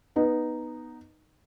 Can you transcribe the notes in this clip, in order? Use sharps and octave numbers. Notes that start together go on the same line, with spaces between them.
B3 D#4